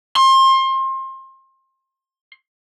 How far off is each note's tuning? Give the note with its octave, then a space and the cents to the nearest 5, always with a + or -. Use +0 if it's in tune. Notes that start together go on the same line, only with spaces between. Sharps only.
C6 +30